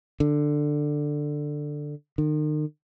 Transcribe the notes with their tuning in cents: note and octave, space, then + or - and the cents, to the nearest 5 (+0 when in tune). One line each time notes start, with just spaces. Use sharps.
D3 +10
D#3 -40